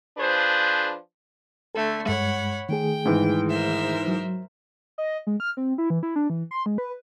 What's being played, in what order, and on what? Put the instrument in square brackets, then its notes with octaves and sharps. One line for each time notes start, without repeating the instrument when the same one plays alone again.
[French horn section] F3 D4 G#4 B4 C5
[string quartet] D3 A3 [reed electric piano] A4
[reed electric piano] G2 G#3 [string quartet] C#5 F#5 B5
[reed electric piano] D#3 A3 G#4 [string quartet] G5
[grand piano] G#2 E3
[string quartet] A#4 C5 E5
[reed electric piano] F#3
[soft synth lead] D#5
G#3
F6
C4
E4
E3
E4
D4
E3
C6
G#3
B4